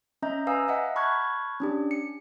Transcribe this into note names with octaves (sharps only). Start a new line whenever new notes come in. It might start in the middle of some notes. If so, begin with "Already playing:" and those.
C#4 D#5 E5 A#5 G6
B4 F5 G#5 A#5 D#6 E6
D#5 E5 F#5 A#5
A5 B5 C#6 F6 F#6 G#6
C#4 D4 G4
C#7